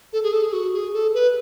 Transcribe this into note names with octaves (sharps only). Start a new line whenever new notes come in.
A4
G#4
A4
G#4
F#4
G#4
A4
B4